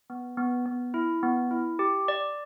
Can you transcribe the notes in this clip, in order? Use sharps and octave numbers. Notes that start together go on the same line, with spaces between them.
B3
B3
B3
E4
B3
E4
G4
D5